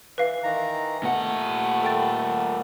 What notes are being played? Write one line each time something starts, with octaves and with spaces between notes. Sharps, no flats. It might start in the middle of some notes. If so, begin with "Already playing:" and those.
E3 B4 F5
D#3 E3 A#5
A#2 A3 F#5
A4 G5 A6